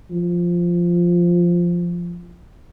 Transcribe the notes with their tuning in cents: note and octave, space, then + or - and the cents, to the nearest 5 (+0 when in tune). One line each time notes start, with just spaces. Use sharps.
F3 -5